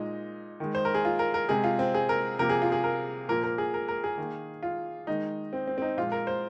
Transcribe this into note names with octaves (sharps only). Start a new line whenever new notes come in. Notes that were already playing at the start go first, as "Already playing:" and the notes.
Already playing: A#2 G#3 D#4
D#3 G#3
C5
A#4
G#4
F4
A#4
A#4
C3 G#3 G#4
F4
C4
G#4
A#4
C3 F3 A#3 A#4
G#4
F4
G#4
A#4
A#2 F3 A#3 A#4
A#4
G#4
A#4
A#4
G#4
D#3 A#3
F4
D#3 G#3 D#4
C4
C4
C4
D#4
A#2 F3 G#3 F4
A#4
C5